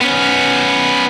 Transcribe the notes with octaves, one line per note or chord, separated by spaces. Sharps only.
B3 C#4